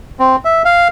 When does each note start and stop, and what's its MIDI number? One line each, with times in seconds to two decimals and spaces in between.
0.19 0.36 60
0.45 0.62 76
0.65 0.88 77